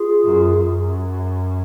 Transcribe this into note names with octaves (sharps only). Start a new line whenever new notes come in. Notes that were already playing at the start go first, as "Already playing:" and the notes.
Already playing: F4 G#4
F#2
F#2